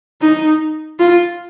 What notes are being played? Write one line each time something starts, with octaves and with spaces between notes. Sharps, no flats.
D#4
F4